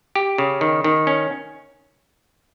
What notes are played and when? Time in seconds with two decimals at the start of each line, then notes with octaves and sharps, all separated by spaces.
0.15 G4
0.38 C#3
0.61 D#3
0.84 D#3
1.07 C#4